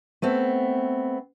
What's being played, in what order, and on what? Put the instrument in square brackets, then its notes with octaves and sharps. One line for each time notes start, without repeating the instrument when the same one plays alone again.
[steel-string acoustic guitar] A3 B3 C4